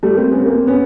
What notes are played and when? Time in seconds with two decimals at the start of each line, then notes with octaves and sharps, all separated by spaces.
0.03 G3 A3
0.17 A#3 C4
0.32 B3 C#4
0.46 A#3 C4
0.67 B3 C#4